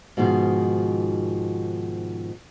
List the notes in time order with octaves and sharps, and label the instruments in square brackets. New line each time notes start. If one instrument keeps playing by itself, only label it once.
[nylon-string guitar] G#2 B2 D#3 F3